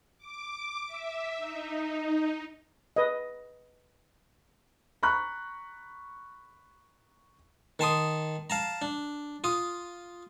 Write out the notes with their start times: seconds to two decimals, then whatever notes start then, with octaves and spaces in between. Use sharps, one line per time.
0.18 D6
0.86 E5
1.38 D#4
2.96 B4 D#5
5.03 A#5 B5 C#6 F#6
7.79 D#3 A5 C6 D#6
8.50 F5 A5 A#5
8.82 D4
9.44 F4 D#6